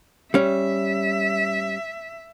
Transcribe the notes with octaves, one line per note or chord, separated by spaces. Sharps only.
G3 C#4 E5